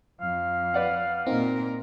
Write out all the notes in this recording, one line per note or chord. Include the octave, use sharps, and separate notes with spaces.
F2 F5
B4 D5 F#5
A#2 C4 D#4 A#4